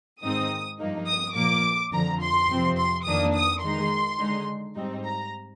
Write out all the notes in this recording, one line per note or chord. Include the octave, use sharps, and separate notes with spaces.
G#2 D#3 G#3 C4 D#4 D#6
G2 F3 A#3 D#4
D#6
A#2 F3 A#3 D6
F2 D3 F3 A#5
C6
F2 C3 F3 C4
C6
F2 D#3 A#3 D4 D#6
D#6
D#3 G#3 D#4 C6
D3 G#3 D#4
G#2 G3 C4 D#4
A#5